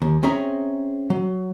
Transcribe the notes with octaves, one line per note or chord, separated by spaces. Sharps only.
D#2
C4 C#4 G#4 E5 A#5
F#3